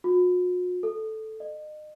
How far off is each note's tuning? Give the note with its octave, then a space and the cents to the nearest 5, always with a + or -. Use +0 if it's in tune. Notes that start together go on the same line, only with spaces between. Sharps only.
F#4 -45
A4 -5
D#5 -35